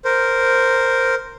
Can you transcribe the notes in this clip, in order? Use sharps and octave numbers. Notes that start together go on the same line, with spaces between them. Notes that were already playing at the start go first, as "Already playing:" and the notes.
A#4 C5